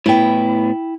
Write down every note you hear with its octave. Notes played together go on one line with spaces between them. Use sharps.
A2 B3 E4 G5